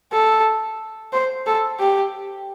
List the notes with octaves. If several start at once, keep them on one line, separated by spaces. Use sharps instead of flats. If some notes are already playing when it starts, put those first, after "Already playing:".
A4
C5
A4
G4